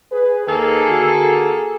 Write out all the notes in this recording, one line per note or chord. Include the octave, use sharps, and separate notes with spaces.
G#4 B4
D#2 D#3 A#3 G#4 A4
D3 F#4